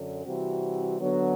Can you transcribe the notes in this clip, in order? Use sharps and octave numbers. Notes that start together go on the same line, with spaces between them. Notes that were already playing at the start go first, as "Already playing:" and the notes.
Already playing: F#2 D3 F#3
C3 E3 G3 C4 F#4
D3 F#3 B3